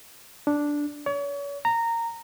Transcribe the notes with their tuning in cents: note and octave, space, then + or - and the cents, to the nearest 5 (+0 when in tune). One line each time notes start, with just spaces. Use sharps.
D4 -5
C#5 +35
A#5 -15